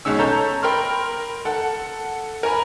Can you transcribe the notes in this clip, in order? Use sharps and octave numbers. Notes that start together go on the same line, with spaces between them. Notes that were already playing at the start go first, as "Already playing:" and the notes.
B1 G#3 C#4 E6
A4 C#5 A#5 G6
A#4 G5 B5 C6 F6
A4 F#5
A#4 G#5 A#5 B5